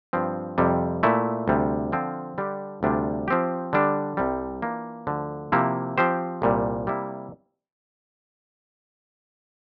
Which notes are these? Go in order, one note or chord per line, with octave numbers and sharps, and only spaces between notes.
G2 F3 C4
F2 C3 G3
A#2 A3 E4
D2 C3 G3
D3 F3 C4 F4
D3 G3 D4 G4
D2 C3 G3 D4 F4
F3 C4 G4
D3 G3 D4
C2 C3 G3
E3 A#3 D4 F4
D2 D3 F3
C3 F3 A#3 E4
F3 C4 G4 C5
C2 A#2 G3
C3 G3 A#3 E4